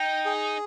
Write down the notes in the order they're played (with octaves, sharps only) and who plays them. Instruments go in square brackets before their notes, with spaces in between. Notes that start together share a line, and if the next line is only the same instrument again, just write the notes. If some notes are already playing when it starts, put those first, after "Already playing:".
Already playing: [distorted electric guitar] D#4 [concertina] G5
[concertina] G#4